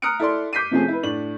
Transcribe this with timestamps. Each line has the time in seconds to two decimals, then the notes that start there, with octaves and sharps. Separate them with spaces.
0.02 A#5 D#6 F6 F#6 C#7 D7
0.20 E4 A4 D5 C6
0.53 D6 G6 B6 C7 D#7
0.71 C3 F3 A3 C4 C#4 G#4
0.88 E4 B4
1.03 A2 D4 F#7